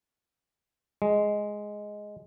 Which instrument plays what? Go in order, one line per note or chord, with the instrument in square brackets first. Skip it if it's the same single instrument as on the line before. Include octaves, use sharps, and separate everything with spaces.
[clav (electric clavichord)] G#3